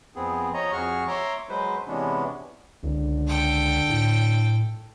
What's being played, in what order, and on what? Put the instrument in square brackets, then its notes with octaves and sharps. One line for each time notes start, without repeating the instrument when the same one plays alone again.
[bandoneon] F2 B3 C4 G#4
F3 C#5 D#5 A#5
F2 F#4 G#4 C#6 F6
C#5 E5 A#5 C6 D6
F#3 G#3 B4 C5
C3 E3 G#3 B3 C#4 D4
[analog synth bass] C#2 [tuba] D3
[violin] A4 G5
[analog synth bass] A2